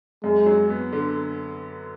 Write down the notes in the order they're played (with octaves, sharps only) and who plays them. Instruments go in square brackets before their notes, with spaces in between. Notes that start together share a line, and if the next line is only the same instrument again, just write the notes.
[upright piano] F#2 [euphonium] G#3
[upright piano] F#3
B3
D3